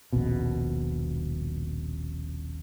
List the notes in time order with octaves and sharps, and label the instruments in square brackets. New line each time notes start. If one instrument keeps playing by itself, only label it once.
[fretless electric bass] D#1 A#1 B2